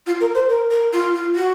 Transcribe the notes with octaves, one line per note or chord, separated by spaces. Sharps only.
F4
A#4
C5
A#4
A#4
F4
F4
F#4